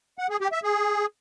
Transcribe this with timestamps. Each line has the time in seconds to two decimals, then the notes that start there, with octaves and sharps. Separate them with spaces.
0.18 F#5
0.30 G#4
0.41 G4
0.52 E5
0.63 G#4